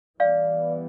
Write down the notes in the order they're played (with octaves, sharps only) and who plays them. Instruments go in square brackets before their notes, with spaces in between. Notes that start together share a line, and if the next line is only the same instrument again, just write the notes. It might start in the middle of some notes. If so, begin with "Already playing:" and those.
[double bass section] E3 G3 B3 [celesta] D5 F5